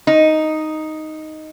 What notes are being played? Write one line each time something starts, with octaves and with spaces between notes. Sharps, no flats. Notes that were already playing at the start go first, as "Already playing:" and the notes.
D#4